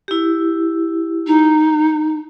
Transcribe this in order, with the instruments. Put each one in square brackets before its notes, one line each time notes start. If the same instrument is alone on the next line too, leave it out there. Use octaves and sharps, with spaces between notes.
[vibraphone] E4 G4
[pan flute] D#4